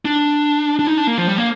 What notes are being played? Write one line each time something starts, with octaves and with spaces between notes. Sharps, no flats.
D4
D4
D#4
D4
A#3
F3
G3
A#3